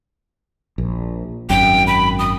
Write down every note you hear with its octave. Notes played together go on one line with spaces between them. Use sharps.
A#1
G#1 F#2 G5
B5
D#6